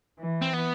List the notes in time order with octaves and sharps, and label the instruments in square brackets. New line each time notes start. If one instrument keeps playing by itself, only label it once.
[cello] E3
[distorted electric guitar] C4
B3